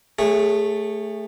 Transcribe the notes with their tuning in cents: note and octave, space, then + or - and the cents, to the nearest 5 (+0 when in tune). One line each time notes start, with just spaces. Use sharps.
A3 +0 G#4 -30 C#5 +0